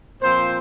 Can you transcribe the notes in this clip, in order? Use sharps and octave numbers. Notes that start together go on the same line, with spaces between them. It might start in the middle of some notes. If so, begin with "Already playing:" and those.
A#2 F3 C4 C5